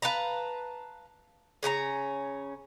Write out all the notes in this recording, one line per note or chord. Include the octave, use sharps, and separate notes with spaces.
B4 F5 A5 A#5
C#3 C#4 D4 A#5